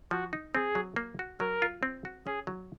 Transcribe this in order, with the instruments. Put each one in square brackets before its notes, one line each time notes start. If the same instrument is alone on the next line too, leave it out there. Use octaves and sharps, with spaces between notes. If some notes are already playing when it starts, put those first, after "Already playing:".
[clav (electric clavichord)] F3 [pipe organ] F#4
[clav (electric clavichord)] D#4
[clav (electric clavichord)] C4 [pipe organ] G#4
[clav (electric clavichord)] F#3
A#3
F#4
[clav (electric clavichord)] F#3 [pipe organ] A#4
[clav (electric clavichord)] F4
C4
F#4
[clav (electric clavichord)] C#4 [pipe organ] G#4
[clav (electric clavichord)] F#3